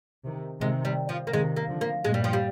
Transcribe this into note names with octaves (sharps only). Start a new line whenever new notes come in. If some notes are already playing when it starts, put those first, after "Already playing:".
C3 D#3
C3 D#3 G#3
G3
F3
A#3
C3 D#3 G#3
A#3
D3 F3
A#3
G2 A#2 G#3
G3
F3
G3